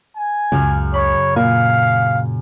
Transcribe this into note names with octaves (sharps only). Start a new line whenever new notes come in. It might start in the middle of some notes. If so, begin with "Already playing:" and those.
G#5
C#2 F#2 C#3 F6
C#5 B5
A#2 F5 G#5